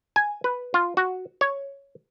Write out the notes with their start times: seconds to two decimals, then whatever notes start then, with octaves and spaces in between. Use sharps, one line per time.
0.16 G#5
0.44 B4
0.74 F4
0.97 F#4
1.41 C#5